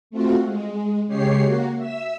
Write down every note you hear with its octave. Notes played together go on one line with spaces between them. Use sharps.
A3 C4 F4 F#4
G#3
C#3 G#3 G4 C#5 C7
A#3 F#4
E5 E6